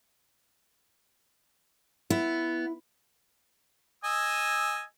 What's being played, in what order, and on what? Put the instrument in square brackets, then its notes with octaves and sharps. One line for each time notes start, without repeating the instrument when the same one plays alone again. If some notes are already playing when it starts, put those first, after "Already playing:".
[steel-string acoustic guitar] B3 [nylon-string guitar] E4
[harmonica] D#5 G#5 E6